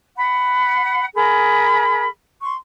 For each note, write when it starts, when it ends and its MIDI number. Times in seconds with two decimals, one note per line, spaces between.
0.16 1.05 78
0.16 1.05 83
1.14 2.07 68
1.14 2.07 70
1.14 2.07 83
2.42 2.54 84
2.42 2.54 85